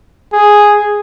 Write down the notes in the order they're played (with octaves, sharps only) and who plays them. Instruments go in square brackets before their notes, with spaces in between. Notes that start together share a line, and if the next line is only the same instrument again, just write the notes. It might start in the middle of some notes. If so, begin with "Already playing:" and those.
[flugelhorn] G#4